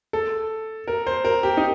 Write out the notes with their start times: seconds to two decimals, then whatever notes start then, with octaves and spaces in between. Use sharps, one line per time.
0.13 A4
0.88 A#4
1.07 C5
1.25 A#4
1.43 G4
1.57 D#4